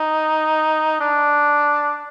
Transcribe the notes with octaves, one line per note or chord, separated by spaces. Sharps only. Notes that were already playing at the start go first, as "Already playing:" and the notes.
Already playing: D#4
D4